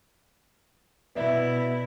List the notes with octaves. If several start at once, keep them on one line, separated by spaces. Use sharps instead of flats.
B2 B3 E4 D5 E5